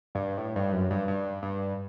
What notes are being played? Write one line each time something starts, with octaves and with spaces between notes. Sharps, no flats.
G2
A2
G2
F#2
G2
G2
G2